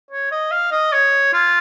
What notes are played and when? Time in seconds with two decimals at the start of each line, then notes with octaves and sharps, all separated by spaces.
0.11 C#5
0.32 D#5
0.51 F5
0.72 D#5
0.93 C#5
1.33 F4